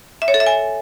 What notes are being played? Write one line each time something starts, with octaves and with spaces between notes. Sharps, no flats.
E5
C#5
A4
E5
G#5